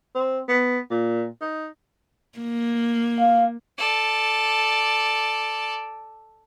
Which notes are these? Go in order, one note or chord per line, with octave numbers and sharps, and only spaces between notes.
C4
B3
A#2
D#4
A#3
F5
A4 D5